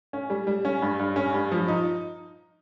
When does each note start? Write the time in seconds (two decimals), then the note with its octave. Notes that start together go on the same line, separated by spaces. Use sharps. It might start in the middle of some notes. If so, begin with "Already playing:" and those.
0.13 C#4
0.30 G3
0.47 G3
0.65 C#4
0.82 G2
0.99 G2
1.16 C#4
1.34 G2
1.52 F3
1.68 D#4